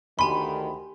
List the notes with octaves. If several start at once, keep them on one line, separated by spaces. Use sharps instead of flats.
D2 D#3 G4 G#5 B5 C6